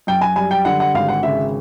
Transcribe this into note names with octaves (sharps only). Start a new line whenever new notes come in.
F#2 G5
G#5
G3 G#5
G5
D3 F#5
F#5
G#1 F5
F#5
C#3 E5